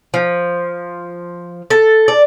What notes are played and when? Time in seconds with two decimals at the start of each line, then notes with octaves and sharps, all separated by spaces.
0.14 F3
1.70 A4
2.08 D5